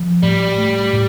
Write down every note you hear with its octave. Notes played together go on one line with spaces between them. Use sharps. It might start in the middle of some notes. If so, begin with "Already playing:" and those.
Already playing: F3
A2 G3
A3
A2